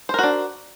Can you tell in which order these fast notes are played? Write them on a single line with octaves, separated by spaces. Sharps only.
C5 A#4 F#4 D4